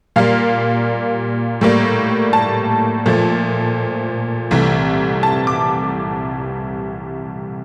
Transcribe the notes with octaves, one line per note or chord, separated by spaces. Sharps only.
A#2 G3 A#3 F5
A2 G3 A#3
A5
A#2 F3 A3
C2 C3 E3 A3
A5
D6